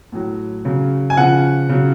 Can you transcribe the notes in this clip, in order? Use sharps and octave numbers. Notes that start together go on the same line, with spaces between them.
A2 F#3
C#3 F#3
G#5
C#3 F3 F#5
C#3 F#3